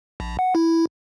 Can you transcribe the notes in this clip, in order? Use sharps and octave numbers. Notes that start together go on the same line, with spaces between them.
A#1
F#5
E4